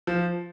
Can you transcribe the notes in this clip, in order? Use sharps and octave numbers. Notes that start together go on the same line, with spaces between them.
F3